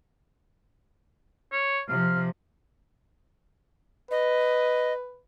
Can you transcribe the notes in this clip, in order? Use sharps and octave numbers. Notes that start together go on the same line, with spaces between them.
C#5
C3 F3 F5
B4 D#5